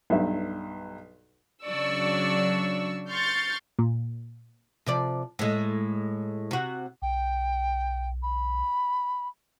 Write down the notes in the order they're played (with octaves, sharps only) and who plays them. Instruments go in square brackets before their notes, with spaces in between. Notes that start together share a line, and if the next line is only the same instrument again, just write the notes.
[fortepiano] B1 G2 E5
[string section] C#3 F#3 D4 D5 C#6 E6
C6 C#6 F6 G6 A6
[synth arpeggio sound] A#2
[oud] C3 F3 D5
A2 G#3
C3 F#4
[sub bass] B1 [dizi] G5
[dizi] B5